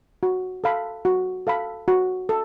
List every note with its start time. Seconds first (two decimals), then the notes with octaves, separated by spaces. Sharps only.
0.23 F#4
0.64 A4 F5 B5
1.05 F#4
1.47 A4 F5 B5
1.88 F#4
2.29 A4